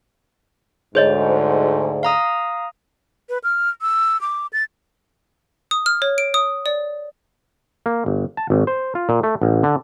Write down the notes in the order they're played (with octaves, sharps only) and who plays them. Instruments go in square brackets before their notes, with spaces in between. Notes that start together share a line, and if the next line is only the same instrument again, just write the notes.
[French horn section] D2 G#2 [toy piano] G#4 C#5 D#5 [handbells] C5
[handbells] F5 A#5 D#6
[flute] B4
F6
E6
D6
A6
[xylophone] D#6
F6
C#5
D7
D#6
D5
[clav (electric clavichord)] A#3
G1
A5
G#1
C5
F4
A#2
A3
A1
D3